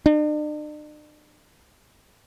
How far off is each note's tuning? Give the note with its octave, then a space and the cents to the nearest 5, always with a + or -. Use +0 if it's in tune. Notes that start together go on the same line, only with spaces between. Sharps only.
D4 +45